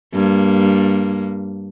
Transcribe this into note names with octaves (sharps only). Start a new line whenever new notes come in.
G2 A#3